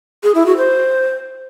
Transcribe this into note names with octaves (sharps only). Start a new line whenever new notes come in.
G#4
E4
F#4
C5